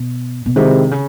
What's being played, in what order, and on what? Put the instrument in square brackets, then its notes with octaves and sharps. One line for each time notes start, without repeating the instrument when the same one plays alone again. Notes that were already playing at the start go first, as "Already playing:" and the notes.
Already playing: [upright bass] B2
B2
[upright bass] C3 [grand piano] D#3 G#3 C4 E4 G4
[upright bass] C#3